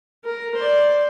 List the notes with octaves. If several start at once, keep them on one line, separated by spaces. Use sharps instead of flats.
A#4
C5 D5